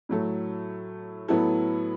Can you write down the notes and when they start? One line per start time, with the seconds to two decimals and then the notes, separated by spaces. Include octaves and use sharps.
0.09 A2 F#3 A3
1.28 A2 F#3 B3 E4 A4